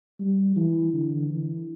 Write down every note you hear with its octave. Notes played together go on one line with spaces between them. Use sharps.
G3
E3
D3
E3